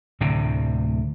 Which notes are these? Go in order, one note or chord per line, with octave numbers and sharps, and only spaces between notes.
D2 A2 C3